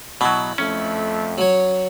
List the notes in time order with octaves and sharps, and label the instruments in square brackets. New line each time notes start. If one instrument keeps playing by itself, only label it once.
[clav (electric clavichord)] B2 F#3 [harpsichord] E4
[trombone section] F2 A3 [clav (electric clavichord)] C#4
[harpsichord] F#3 C#5